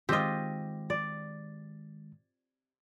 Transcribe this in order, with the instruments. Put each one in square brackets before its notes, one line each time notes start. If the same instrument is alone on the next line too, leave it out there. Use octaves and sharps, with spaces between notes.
[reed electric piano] D#3 G#3 [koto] C4 F4 [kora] G4 D#5
[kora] D5